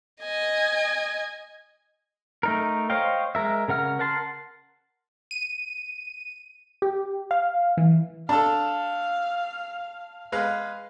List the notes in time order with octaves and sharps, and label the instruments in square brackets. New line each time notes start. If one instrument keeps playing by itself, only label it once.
[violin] D#5 G#5
[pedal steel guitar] A3 D#4 A#4
C5 C#5 D#5 F5 G5
G#3 A#4 E5
C#3 A#4 F#5 F6
A#4 F#5 A5 C6
[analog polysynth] D#7
G4
F5
E3
[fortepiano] D4 A4 [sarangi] F5 [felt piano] A5
[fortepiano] G#3 B4 F5